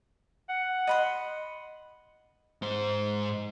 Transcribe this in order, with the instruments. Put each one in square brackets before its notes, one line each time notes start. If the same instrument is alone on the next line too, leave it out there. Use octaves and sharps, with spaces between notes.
[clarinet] F#5
[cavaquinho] D#5 B5 C6
[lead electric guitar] G#2 C5